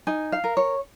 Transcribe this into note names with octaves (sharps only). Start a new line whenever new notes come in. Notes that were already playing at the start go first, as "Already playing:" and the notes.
D#4 G#5
F5
A#4
C#5